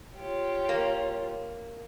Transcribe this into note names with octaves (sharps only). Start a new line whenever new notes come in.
F4 G4 C#5
A#3